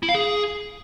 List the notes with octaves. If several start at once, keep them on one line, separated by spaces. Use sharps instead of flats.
E4
F5
G#4